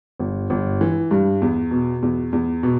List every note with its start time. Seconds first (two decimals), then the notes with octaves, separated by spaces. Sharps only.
0.20 G1
0.50 G1
0.81 E3
1.11 G2
1.42 E2
1.71 B2
2.02 E2
2.33 E2
2.63 B2